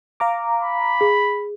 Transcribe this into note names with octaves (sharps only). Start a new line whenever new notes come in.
F5 A#5 D6
B5
G#4